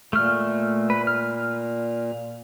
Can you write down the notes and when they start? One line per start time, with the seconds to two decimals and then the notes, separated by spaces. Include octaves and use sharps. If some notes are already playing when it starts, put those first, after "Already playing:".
0.13 A#2 A3 F6
0.90 B4
1.07 F6